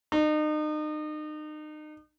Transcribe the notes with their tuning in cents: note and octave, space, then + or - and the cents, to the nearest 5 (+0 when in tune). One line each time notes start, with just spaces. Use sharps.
D#4 -35